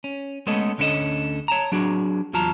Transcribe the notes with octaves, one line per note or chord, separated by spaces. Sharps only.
C#4
G#3 A3 B3 C#4 A4 D#5
D2 D3 C#4 D#4 A4 D#5
C#5 A5 A#5
F#3 D4 F#4 G#4
E2 F#3 F4 A5 A#5